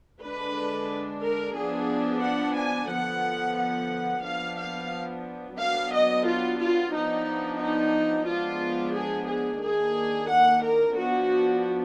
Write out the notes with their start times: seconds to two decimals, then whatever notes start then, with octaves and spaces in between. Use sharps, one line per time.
0.22 D3 G#3 D4 B4
1.23 A#4
1.56 F3 B3 D4 G#4
2.23 F#5
2.57 G#5
2.90 D3 F3 B3 F#5
3.58 F#5
4.24 F3 B3 D4 F5
4.58 F5
5.58 F#3 B3 D4 F5
5.92 D#5
6.25 F4
6.59 F4
6.93 F3 B3 D4 D#4
7.59 D#4
8.27 F3 G#3 B3 D4 F4
8.93 G#4
9.28 G#4
9.61 D#3 A#3 D4 G#4
10.28 F#5
10.62 A#4
10.95 F3 B3 D4 F#4